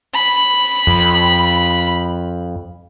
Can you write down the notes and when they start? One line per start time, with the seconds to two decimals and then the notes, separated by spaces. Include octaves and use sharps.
0.15 B5
0.87 F2